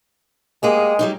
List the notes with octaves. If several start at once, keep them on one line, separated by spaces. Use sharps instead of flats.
G#3 A#3 G4 G#4
F#3 G3 D#4